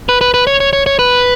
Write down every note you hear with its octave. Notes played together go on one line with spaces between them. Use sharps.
B4
B4
B4
C#5
C#5
C#5
C#5
B4